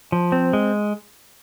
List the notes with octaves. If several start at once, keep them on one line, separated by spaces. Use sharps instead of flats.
F3
C4
G#3